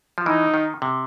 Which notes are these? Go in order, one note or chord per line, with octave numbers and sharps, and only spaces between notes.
F3
E3 D#4
D#3
C3